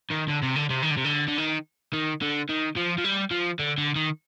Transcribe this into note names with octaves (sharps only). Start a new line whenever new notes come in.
D#3
D3
C3
D3
C3
D#3
D3
C3
D3
D3
D#3
D#3
D3
D#3
F3
F3
G3
F3
D3
D3
D#3